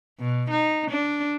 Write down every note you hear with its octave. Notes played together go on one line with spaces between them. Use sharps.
B2
D#4
D4